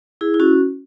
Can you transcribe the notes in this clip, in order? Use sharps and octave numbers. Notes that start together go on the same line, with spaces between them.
E4 G#4
E4
C#4 F#4